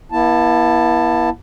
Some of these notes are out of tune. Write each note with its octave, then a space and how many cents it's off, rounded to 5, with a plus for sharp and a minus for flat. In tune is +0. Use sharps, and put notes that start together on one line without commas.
B3 -45 E4 +0 A5 +5